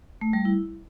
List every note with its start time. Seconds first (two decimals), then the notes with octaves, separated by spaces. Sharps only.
0.21 A3
0.33 G3
0.45 E4